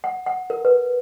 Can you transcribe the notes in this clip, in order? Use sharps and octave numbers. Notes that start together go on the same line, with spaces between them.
F#5
F#5
A#4
B4